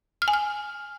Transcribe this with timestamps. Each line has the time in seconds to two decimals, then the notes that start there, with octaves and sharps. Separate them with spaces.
0.22 F6
0.28 G#5
0.33 F6